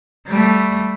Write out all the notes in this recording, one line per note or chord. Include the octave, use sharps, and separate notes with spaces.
G3 A3